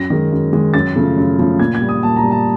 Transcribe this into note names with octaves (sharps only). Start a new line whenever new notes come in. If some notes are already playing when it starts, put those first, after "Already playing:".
Already playing: F#2 A#6
D#3 G#3
F#2
D#3 G#3
F#2 A6
C#3 F3 A3
F#2
C#3 F3 A3
A#2 G#6
G#6
G3
D#6
A#2 A5
A#5
G3
A5